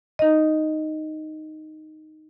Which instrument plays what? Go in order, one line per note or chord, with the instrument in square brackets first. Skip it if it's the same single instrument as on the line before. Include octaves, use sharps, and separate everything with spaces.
[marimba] D#4 D#5